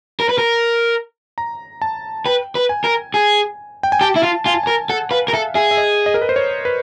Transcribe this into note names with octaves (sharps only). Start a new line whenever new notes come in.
A#4
B4
A#4
A#5
A5
B4 G5
B4
G#5
A#4
G#4
G5
G#5
G4 A5
E4
F4
F4 G#5
A5
G#5
A#4
A4 F#5
B4 F5
A#4
A4 E5
G#4 E5
E5
D#5
D#5
A#4
B4
C5
C#5
B4